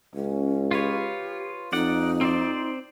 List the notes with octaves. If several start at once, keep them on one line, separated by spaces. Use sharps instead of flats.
C#2 C#4
F4 G4 B4 C#5
F2 D#4 D5 F#5
C4 C5 D5